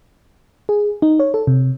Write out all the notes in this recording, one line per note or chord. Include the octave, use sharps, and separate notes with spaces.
G#4
D#4
C#5
A4
C3